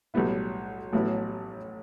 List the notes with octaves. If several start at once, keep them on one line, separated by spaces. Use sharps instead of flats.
B1 A2 G3 B3 E4
A1 A2 F#3 B3 E4